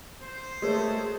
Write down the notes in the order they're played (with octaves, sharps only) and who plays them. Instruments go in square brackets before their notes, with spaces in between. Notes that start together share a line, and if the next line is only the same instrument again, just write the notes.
[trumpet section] C5
[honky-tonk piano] G#3 [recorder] A3 [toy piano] F#4 A#4 C#5